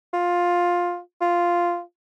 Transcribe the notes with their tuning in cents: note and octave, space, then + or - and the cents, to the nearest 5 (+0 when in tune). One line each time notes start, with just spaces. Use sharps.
F4 +10
F4 -5